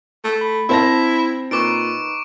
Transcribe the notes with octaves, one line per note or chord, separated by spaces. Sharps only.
A3
B5
C4 E4 E5 A5 C6 A#6
A#2 D#4 B4 C#6 D6 D7